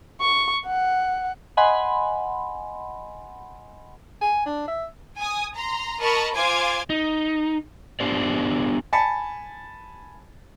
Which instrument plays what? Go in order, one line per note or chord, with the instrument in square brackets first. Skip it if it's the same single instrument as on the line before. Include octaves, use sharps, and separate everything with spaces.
[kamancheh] C#6
F#5
[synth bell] D#5 F#5 G#5 B5 C6
[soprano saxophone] G#5
D4
E5
[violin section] G#5 D#6
A#5 C6
A#4 D#5 A5 B5 C#6
F4 C5 G#5 C6 D6 G#6
[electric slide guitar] D#4
B3 D4 G4 C5 D5
[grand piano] G#5 A5 B5 A6 C#7